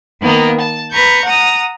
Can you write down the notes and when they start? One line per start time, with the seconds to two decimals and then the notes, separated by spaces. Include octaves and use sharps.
0.21 D#3 A#3 B3
0.60 A5
0.91 B4 A#5 C#6 G6
1.24 F#5 A#5 D#6